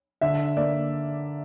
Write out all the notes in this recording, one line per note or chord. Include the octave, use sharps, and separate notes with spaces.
D3 E5
A#3 D5